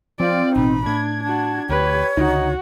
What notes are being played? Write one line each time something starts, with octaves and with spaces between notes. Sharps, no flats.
F3 C4 F4 D5
A1 B2 D#4 B5
A2 D4 G#6
D4 F#4 A5
D2 G4 B4 C#5
C#2 D3 D#4 F#4